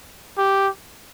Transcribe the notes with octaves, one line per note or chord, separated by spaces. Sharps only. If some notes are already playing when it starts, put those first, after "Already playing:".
G4